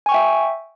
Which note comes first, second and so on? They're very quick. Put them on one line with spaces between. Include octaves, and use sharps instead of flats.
G#5 C#6 G5 E5